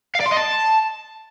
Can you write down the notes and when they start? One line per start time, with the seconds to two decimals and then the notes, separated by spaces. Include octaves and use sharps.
0.15 F5
0.20 D5
0.26 C6
0.31 D#5
0.37 A5